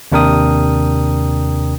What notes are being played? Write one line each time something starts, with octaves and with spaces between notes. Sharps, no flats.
D#2 C3 D4 A#4 G5 D#6